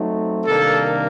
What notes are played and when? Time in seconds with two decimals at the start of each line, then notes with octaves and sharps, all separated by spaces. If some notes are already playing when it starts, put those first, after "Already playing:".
Already playing: F#3 A3 C4 D#4
0.45 C3 D#3 G3 A#3 D4 A4